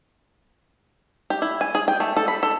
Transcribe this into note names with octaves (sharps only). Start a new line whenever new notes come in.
G4
E4
G#5
G#4
G5
A3
A4
B5
A4